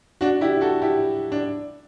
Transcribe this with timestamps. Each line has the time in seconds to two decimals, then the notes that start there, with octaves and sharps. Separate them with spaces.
0.21 D4 F#4
0.41 E4 G4
0.61 F#4 A4
0.82 E4 G4
1.32 D4